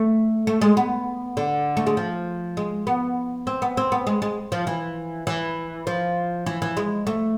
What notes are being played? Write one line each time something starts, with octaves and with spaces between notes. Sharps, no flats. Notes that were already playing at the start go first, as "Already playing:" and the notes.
Already playing: A3
A3
G#3
B3
D3
A3
G#3
F3
G#3
B3
C4
B3
C4
B3
G#3
G#3
F3
E3
E3
F3
E3
E3
G#3
A3